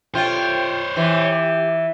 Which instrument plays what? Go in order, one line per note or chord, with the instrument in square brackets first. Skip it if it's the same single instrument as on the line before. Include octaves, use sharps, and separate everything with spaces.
[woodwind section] C3 A4 G5 [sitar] F4 [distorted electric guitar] C5 C#5
[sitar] E3 [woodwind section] G4